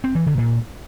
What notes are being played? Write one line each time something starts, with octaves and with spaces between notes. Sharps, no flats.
C4
E3
D3
A#2